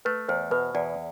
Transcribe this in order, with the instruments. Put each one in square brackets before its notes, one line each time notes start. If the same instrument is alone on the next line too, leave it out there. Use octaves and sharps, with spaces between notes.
[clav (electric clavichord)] A3 [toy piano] B4
[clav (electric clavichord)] E2 [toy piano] C5
[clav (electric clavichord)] B2 [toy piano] B4
[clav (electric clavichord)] E2 [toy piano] D5